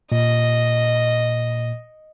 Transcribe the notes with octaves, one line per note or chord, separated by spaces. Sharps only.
A#2 D#5